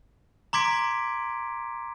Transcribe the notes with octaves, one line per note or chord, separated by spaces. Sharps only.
A#5 C6 D6 G#6 B6 D7